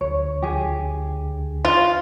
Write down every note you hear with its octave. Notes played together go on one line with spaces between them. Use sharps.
D2 C#5
G4 G#4
F4